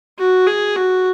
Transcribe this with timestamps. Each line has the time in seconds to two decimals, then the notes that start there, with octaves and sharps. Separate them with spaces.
0.18 F#4
0.47 G#4
0.76 F#4